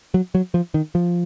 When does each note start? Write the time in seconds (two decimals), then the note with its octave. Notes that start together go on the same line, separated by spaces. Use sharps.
0.14 F#3
0.35 F#3
0.54 F3
0.74 D#3
0.95 F3